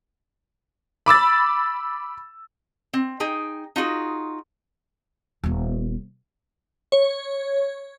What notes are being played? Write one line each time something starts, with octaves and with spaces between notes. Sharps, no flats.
B5 D6 E6 A6
C4
D#4 G#4 G5
D#4 F4 F#4 G#4
D#1 B3
C#5